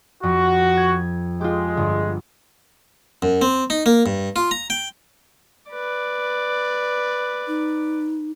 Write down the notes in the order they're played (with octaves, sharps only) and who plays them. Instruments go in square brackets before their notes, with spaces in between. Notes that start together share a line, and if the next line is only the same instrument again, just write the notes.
[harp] F2 [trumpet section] F#4
[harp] G#6
[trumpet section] G#3 [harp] F4 G4
[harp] G1
[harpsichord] F#2
C4
D#4
A#3
G2
F4
A#5
G5
[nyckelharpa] B4 D5
[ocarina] D#4